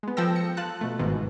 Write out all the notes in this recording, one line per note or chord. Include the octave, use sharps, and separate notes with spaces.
G#3 B3
F3 A4 G5 E6 A#6
C#7
F4 A5 F#6
B2 A3
G1 G#2 B2 D#3